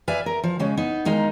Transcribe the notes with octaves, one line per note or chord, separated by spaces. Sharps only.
B4 D5 E5 F5 G#5
A#4
F3
C#3 G#3 C#4
B3 D#4
D#3 G#3 D#4 F5